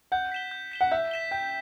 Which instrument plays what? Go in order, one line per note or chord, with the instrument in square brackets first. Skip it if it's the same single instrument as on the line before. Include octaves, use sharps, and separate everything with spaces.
[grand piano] F#5 [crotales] G6
[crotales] B6 E7 G7
G6
B6 E7 G7
[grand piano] F#5
[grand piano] E5 [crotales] G6
[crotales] B6 E7 G7
[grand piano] G5 [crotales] G6